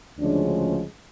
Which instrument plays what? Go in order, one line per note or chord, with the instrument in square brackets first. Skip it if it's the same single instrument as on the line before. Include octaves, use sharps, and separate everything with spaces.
[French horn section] D2 C#3 F3 G#3 C#4 D4